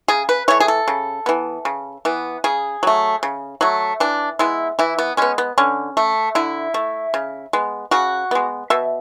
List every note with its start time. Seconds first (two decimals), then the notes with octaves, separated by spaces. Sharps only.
0.08 C#3 G#4
0.29 B4
0.48 E3 A3 C#5
0.60 G#4
0.68 A4
0.88 C#3
1.26 E3 B3
1.65 C#3
2.05 E3 B3
2.44 C#3 G#4
2.83 F#3 A3
3.23 C#3
3.61 F#3 A3
4.00 E3 D4
4.39 G#3 B3 E4
4.79 E3 E4
4.99 B3
5.17 G#3 B3 C#4
5.38 B3
5.58 D3 C#4
5.97 A3
6.35 D3 E4
6.74 A3
7.14 C#3
7.53 G#3 B3
7.91 C#3 F#4
8.31 G#3 B3
8.70 B2 E5